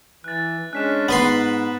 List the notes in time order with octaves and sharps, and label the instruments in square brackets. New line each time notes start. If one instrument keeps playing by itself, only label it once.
[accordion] E3 [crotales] F#6 A6
[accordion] G#3 C#4 D4 [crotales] F#6 B6 E7
[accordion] G#2 [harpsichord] B3 B4 C6